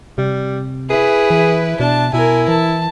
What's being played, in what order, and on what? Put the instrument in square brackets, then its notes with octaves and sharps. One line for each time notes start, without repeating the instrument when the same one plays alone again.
[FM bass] C3 [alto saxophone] G3
[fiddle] E4 B4 [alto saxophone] G#4
[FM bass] E3
[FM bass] B2 [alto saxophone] D4 [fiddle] A5
[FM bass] B2 [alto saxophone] E4 [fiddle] A#4 G#5
[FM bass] E3 [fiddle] A5